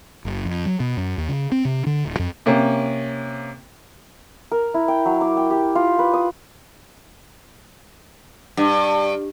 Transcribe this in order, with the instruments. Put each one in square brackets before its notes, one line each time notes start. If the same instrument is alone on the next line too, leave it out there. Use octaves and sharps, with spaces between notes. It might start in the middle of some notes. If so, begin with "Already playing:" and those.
[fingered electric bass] F#1
F2
F#3
B2
F#2
D#2
C#3
C4
C3
D3
D1
F2
[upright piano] C3 A#3 C#4
[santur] A#4
E4
G5
F#3
D6
G5
G4
F4
B4
D#6
[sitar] G2